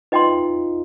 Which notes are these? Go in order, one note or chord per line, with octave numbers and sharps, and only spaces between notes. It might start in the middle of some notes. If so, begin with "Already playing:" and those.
D#4 F4 B4 D#5 G5 C6